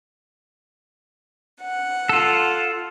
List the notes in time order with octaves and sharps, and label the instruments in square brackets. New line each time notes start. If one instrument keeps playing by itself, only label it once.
[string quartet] F#5
[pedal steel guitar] F4 A4